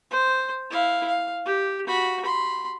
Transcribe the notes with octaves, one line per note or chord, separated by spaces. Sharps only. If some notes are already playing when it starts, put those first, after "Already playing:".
C5
E4 F5
F5
G4
F#4 B5
B5 C6